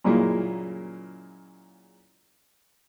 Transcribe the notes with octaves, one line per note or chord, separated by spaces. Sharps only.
F#2 A#2 C#3 G#3 A#3 E4